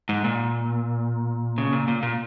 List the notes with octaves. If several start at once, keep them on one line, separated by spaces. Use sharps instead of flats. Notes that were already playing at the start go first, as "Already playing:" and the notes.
G#2
A#2
C#3
A#2
A#2
A#2